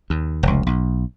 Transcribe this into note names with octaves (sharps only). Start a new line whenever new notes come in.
D#2
F1 C#2
B1